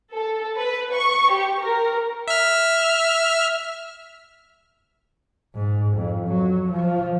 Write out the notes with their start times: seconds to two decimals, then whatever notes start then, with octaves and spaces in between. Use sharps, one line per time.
0.14 A4
0.56 B4
0.94 C#6
1.32 G4
1.62 A#4
2.27 E5 F6
5.55 G#2
5.98 F2
6.28 F#3
6.72 F3